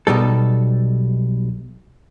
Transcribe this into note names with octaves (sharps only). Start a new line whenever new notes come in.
B1 B2 G3 A4